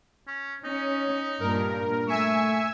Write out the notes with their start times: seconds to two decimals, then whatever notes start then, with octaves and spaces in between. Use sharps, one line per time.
0.27 C#4
0.64 C#4 D#4
1.40 G2 A#2 A#4
2.08 A3 E5 G#5 C#6 E6